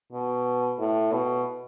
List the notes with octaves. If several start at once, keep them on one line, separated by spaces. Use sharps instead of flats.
B2
A2
B2